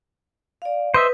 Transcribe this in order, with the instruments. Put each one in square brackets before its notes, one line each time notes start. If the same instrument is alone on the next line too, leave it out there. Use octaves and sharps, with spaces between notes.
[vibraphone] D5 F5
[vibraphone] B4 [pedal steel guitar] C5 D#5 E5